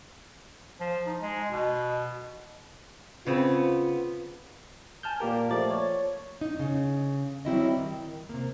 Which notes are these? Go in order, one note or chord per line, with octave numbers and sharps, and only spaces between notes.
F3
D#4
G#3
B2
C#3 B3 C4 F4
G#5 A5 F6 G6
A#2 A#3 G4 A#4
F3 A3 D5 A6
C#5
D#4
C#3
F#3 G3 C4 E4 F#4 D#5
D#3
C3 A#3